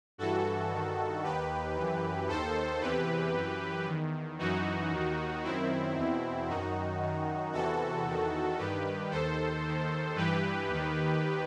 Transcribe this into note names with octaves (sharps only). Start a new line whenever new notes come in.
G2 E3 F#4 A4
G2 D#3
D#2 D#3 G4 B4
F#2 E3
D#2 D#3 A4 C5
E2 C3 E3 G4 B4
F#2 E3
E2 D#3
F#2 E3 D#4 F#4
D#2 D#3
F#2 D#3 C4 E4
E2 B2
F#2 D#3 D#4 F#4
F#2 D#3
E2 C3 E3 F#4 A4
E2 D#3
G2 D#3 G4 B4
D#2 D#3 A4 C5
D#2 D#3
G2 E3 G4 B4
D#2 D#3